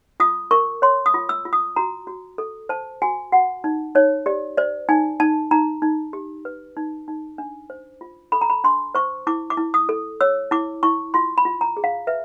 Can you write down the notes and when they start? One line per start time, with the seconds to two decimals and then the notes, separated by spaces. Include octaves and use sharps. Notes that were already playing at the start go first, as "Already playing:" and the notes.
0.20 F4 D#6
0.51 A#4 C#6
0.82 C#5 C6
1.06 D#6
1.14 F4
1.29 E6
1.45 F4
1.53 D#6
1.76 F#4 A#5
2.07 F#4
2.38 A4
2.69 C5 A5
3.02 F#4 G#5
3.32 F#4 F#5
3.64 D#4
3.95 D#4 C#5
4.26 G4 D5
4.57 C5 D5
4.89 D#4 G#5
5.20 D#4 A5
5.51 D#4 A#5
5.82 D#4
6.13 G4
6.45 B4
6.77 D#4
7.08 D#4
7.38 D4
7.70 C5
8.01 F4
8.32 A4 B5
8.41 A#5
8.50 B5
8.64 D4 C6
8.95 C5 C#6
9.27 E4 D6
9.50 D6
9.57 E4
9.74 D#6
9.89 A4
10.21 C#5 E6
10.51 E4 D6
10.83 E4 C#6
11.14 F4 C6
11.38 B5
11.45 F4
11.61 A#5
11.77 G#4
11.84 F5
12.07 B4 E5